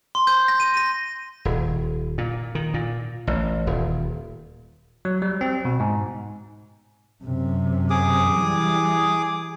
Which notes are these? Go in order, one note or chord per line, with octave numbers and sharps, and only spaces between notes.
C6
G6
A#6
D#7
A#6
D#1
A#2
D#3
A#2
A1
D#1
F#3
G3
C4
B2
G#2
F#2 C3
G#4 D6 D#6
E3 G3